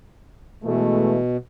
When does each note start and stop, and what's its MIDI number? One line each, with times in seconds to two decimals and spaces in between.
0.64 1.37 47
0.64 1.17 52
0.64 1.17 56
0.64 1.17 57